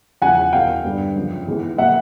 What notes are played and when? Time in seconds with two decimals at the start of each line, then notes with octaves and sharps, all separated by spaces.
0.22 E2 C#3 F3 F#5 G#5
0.53 F#1 E2 B2 F5 G5
0.84 G2 D3 G3 B3
1.16 F#2 C#3 F3
1.47 G#2 E3 G#3 B3
1.78 B2 F#3 A#3 E5 F#5